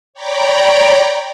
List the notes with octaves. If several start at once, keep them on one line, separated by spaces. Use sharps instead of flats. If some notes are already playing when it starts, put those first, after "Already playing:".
C#5 D5 G5 A#5 B5 D6